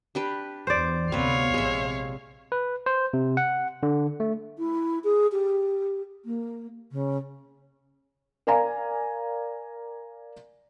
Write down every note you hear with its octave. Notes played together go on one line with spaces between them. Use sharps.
D4 G4 B4
E2 C5 D5
D2 C3 B3 C4 B4 C#5 F5
A#1 C3 G#3 E5
B4
C5
C3
F#5
D3
A3
E4
G#4
G4
A#3
C#3
A#4 D5 F5 G#5 A#5